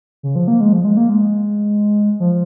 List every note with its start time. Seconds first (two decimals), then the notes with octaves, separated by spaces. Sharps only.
0.23 C#3
0.36 F3
0.48 A#3
0.61 G#3
0.73 F3
0.84 G#3
0.97 A#3
1.09 G#3
2.20 F3